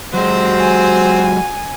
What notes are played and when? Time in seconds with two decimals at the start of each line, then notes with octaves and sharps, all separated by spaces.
0.14 F#3 G#3 C4 F#4 C5
0.60 G#5